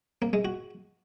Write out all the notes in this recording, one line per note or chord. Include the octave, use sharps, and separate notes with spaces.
A#3
G#3
F#4